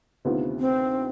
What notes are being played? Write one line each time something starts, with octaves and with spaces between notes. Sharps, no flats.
D2 C3 D#3 B3 F4
C4